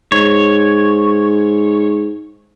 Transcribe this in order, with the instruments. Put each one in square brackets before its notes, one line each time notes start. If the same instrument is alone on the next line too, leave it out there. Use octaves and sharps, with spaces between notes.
[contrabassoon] G#2 [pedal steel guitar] C#5